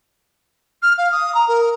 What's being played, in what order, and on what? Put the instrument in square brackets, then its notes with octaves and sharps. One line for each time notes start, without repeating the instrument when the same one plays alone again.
[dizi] F6
F5
D#6
A#5
A#4